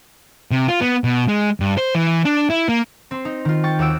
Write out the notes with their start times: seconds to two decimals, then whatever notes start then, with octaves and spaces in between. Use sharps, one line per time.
0.51 C3
0.68 F4
0.81 B3
1.04 B2
1.28 G#3
1.60 G2
1.78 C5
1.95 E3
2.25 D4
2.50 E4
2.69 A#3
3.11 C4 C6
3.25 D#4
3.45 D#3 F4
3.63 G5 C#6 A6
3.79 D#2 F#4 E6 D7